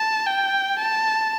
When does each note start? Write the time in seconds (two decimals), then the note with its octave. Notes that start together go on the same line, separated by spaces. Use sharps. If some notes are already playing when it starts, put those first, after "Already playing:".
Already playing: A5
0.26 G5
0.79 A5